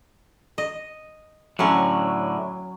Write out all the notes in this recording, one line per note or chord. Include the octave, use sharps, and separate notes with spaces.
D#5
A2 D3 F#3 C#4